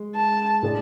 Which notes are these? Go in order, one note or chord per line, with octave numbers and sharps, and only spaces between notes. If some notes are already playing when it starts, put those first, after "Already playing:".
Already playing: G#3
A5
A2 G#3 D4 G#4